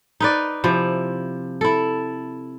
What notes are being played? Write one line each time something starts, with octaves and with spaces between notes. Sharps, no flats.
D#4 B4 D5
C3 F3 E4
E4 A4